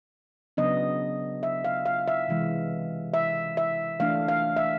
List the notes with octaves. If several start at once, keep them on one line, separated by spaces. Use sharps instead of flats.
C#3 F#3 B3 D4 D#5
E5
F5
F5
E5
C3 E3 G#3
E5
E5
E3 A3 D4 F5
F5
E5